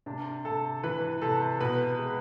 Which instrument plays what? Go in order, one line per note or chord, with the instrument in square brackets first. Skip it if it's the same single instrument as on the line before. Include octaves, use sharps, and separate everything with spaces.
[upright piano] C3 D4
C3 A4
E3 B4
C3 A4
B2 B4
G#3